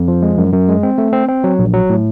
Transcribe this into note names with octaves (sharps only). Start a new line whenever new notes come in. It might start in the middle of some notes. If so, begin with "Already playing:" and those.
Already playing: F2
F3
G#3
F#2
F#2
G#3
C4
A3
C4
C4
F#3
A#1
F#3
A2